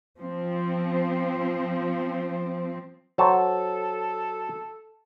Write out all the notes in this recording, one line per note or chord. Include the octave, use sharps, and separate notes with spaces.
F3 C4
F#3 A4 C5 A5